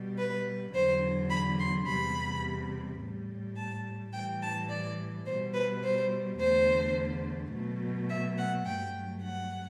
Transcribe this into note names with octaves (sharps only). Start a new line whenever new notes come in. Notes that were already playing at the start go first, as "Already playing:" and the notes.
Already playing: B2 G3
B4
E2 D3 F#3 C5
B5
C6
E2 C3 G3 B5
A2
G3
A5
A2 E3 G3 G5
A5
D5
B2 G3 C5
B4
C5
E2 D3 A3 C5
B2 F#3 A3
E5
F#5
G2 F#3 A3 G5
F#5